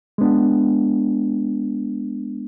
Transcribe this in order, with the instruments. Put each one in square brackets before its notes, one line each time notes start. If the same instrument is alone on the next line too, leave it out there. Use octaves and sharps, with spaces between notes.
[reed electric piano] G#3 B3 D4